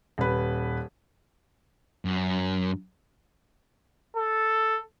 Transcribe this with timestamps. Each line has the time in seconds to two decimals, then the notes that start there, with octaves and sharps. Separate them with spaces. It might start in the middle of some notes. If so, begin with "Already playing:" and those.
0.18 D#1 B4
2.05 F#2
4.17 A4